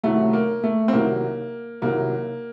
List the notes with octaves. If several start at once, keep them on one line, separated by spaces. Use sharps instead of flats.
C2 C3 D#3 F#3 A3
A#3
A3
C4
C2 C3 D#3 F#3 A#3
C2 C3 D#3 F#3 A#3